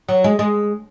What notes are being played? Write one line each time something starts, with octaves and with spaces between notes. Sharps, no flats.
F#3
G#3
G#3